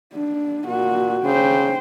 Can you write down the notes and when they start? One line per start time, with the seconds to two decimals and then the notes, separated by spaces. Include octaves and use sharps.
0.14 D4
0.67 A#2 F#4
1.24 C#3 C5 G5